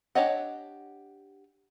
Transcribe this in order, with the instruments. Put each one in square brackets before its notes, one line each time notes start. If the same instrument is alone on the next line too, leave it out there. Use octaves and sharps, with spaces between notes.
[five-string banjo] D4 G4 C#5 D#5 F#5